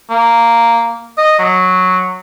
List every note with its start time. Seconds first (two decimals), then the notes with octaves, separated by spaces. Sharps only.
0.10 A#3
1.18 D#5
1.39 F#3